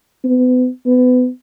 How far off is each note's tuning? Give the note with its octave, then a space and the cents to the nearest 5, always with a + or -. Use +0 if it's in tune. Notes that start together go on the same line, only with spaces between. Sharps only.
B3 +35
B3 +25